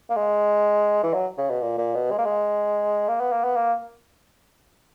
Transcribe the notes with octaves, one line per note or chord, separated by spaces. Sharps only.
A#3
G#3
E3
F#3
C#3
B2
A#2
A#2
B2
G#3
A#3
G#3
A#3
B3
A#3
B3
A#3